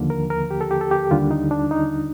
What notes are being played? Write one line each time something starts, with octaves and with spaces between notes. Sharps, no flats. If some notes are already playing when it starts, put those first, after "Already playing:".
Already playing: D#2 D3 F3 A#3
A#4
A#4
G4
A4
G4
A4
G4
D#2 D3 G3 D4 F4
D#4
D4
D#4